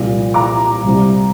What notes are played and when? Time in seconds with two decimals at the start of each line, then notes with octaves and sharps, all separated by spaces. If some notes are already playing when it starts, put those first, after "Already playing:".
Already playing: C2 A#2 F3
0.34 A#5 D6
0.84 C2 C3 G3